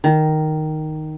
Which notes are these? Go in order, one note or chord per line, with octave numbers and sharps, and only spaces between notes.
D#3